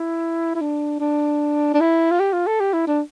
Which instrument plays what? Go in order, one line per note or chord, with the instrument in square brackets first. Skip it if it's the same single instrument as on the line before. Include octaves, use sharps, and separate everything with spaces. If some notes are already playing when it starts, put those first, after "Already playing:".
Already playing: [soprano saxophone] E4
E4
D4
D4
D4
E4
F4
G4
F4
A4
G4
E4
D4